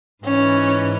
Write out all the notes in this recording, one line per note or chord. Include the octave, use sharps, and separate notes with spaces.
G#2 E3 C#4